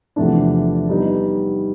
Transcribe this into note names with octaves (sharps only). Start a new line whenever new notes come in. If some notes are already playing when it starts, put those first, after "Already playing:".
E2 C3 F3 A3 D4
G3 B3 D#4